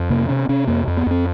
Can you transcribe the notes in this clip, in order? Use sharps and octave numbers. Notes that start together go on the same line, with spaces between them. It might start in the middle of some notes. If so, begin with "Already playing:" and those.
Already playing: F2
C3 A#3
C3 C#4
C3 C#4
F2 A#3
F2
B3
F2 C4